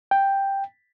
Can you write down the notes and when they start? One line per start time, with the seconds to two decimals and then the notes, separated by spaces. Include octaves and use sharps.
0.11 G5